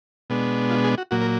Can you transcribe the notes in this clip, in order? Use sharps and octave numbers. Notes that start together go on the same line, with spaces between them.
B2 G#3 B3 D4
F4
G#4
F#4
A#2 F#3 A#3 F#4
A#4